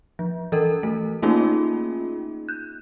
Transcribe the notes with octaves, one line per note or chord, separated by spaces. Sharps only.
F3
E3 A4 A#4
A3
A3 A#3 C#4 D#4 F4 G#4
F#6 G6